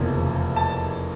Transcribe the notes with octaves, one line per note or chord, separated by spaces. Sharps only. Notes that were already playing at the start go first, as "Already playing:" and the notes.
Already playing: F1 E2 C#3 F3 A#3
A5